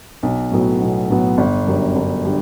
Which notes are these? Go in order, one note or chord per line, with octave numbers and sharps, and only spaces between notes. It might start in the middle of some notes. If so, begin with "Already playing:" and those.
B1
A2 F#3 B3
B1
A2 F#3 B3
G1
F#2 D3 G3
G1
D3 G3